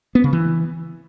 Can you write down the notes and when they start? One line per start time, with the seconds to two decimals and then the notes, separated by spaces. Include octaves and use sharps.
0.15 B3
0.24 C#3
0.33 E3